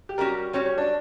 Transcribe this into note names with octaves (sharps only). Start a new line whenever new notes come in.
G4
G3 C#4 F#4 A#4
G3 C#4 F#4 C#5
C#5
D4